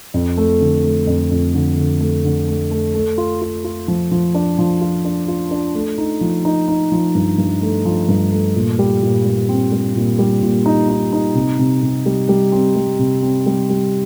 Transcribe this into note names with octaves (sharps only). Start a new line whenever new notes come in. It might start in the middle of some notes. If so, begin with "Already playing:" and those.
F2
A3
D3
A3
F2
F2
D3
D3
A3
D3
A3
A3
A3
F4
F4
F4
F3
F3
D4
F3
F4
D4
F4
D4
A3
D#4
F3
D#4
D#4
F3
G2
G2
A3
F3
G2
A3
A#2
G3
A#2
G3
C4
G3
A#2
G3
A#2
D#4
D#4
D#4
C3
C3
C3
G3
G3
C4
G3
C3
C4
G3
G3